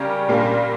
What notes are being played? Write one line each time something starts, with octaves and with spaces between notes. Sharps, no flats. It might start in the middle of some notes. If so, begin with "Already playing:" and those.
Already playing: C#3 G3 C#4 G4 A#4
A#2 G3 A#3 D4